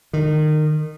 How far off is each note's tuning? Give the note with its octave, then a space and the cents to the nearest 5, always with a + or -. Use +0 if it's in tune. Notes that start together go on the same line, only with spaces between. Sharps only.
D#3 -25